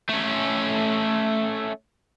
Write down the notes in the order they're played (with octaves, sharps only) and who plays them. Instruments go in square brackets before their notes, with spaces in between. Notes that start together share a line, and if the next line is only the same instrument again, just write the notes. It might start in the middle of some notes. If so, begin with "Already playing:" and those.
[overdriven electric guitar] A3 C#4